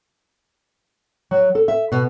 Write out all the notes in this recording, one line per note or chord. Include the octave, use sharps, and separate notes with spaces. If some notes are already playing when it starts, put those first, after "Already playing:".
F#3
A4
E5
B2